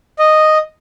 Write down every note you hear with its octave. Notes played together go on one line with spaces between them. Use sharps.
D#5